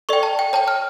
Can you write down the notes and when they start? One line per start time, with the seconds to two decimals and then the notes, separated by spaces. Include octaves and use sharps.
0.09 A4 D5 G5 C#6
0.23 A5
0.39 G5
0.53 C#5 G5 A5
0.68 F6